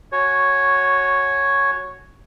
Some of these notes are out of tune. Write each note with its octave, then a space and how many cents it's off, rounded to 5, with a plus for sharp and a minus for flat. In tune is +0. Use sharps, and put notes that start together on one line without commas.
F#4 +0 C#5 -5 G#5 +30